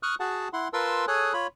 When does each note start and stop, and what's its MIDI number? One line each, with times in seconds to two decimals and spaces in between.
0.03 0.15 85
0.03 0.15 87
0.03 0.15 89
0.03 0.15 90
0.20 0.48 66
0.20 0.48 68
0.20 0.48 78
0.20 0.48 81
0.53 0.68 64
0.53 0.68 78
0.53 0.68 84
0.73 1.05 65
0.73 1.05 70
0.73 1.05 71
0.73 1.05 81
0.73 1.05 84
0.73 1.05 88
1.08 1.33 68
1.08 1.33 69
1.08 1.33 73
1.08 1.33 80
1.08 1.33 87
1.08 1.33 90
1.33 1.47 65
1.33 1.47 73
1.33 1.47 83